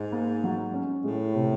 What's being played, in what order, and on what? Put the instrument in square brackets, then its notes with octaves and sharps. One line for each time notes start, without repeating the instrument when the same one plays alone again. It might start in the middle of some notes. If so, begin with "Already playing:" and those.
Already playing: [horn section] G#2
[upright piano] A#3
F#3
C#4
[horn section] A2 [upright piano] G#3
[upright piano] C3